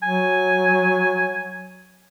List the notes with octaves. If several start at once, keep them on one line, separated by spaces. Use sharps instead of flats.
F#3 G#5